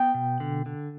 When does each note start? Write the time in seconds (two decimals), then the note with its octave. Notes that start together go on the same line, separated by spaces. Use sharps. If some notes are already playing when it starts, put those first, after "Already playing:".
Already playing: B3 G5
0.14 B2
0.40 D3
0.66 D3